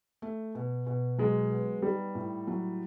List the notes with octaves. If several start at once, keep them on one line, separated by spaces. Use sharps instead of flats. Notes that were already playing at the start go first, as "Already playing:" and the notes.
A3
B2
B2
F#3 G#3
B3
G3 D#4
A2
F#3